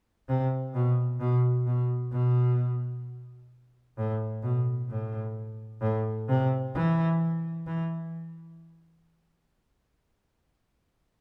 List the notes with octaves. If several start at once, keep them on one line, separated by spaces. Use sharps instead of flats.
C3
B2
B2
B2
B2
A2
B2
A2
A2
C3
E3
E3